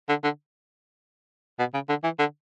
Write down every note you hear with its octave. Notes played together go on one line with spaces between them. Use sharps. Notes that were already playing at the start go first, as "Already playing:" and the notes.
D3
D3
B2
C#3
D3
E3
D3